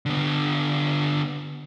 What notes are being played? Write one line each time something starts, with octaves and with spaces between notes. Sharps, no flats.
D3 B3